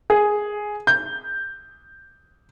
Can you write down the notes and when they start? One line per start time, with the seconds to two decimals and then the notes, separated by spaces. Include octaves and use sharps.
0.10 G#4
0.87 G6